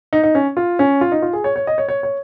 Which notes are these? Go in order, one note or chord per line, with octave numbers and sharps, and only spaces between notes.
D#4
D#4
C#4
F4
C#4
F4
D#4
F4
G#4
C#5
C#5
D#5
C#5
C#5
C#5